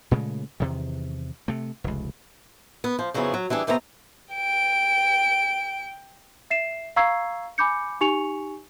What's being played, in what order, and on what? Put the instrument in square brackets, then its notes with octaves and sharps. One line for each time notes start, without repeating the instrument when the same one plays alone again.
[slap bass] A#2 C#3 G#3 A3
E2 C3 D#3
C3 A3
F1 C#2
[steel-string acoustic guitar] B3
F3
F2 C#3 F#3 B3 E4 G#4
F#3
E3 G3 D4 G#4
D#2 C3 A3 B3 B4 A#5
[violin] G5 D7
[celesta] E5 C7 E7
F5 A#5 C#6 E6 G#6 C7
G#5 B5 D6 G6 C#7
D#4 G4 G#5 C#6 C#7 F7